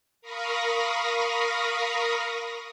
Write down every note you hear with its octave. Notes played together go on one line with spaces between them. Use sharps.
A#4 F5 B5 C#6 D#6 A#6